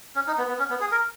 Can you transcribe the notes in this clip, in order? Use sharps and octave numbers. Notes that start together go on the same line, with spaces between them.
C#4
D#4
B3
B3
C#4
B3
G#4
A#4